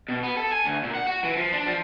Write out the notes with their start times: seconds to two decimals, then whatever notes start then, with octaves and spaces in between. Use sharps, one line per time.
0.09 B2
0.23 B3
0.37 A4
0.52 G#5
0.64 D2
0.83 A#2
0.95 F#5
1.07 F#4
1.24 E3
1.37 F3
1.53 D4
1.66 F3